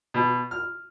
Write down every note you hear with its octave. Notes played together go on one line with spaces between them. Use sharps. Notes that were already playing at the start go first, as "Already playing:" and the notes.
B2
F6